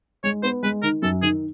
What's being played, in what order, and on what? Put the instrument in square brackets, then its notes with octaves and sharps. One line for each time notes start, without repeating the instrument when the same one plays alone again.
[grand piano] G#3 [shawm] C#5
[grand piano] B3 [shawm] C5
[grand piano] G#3 [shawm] B4
[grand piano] D#3 [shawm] A#4
[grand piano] F#2 [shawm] A4
[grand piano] D#3 [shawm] G#4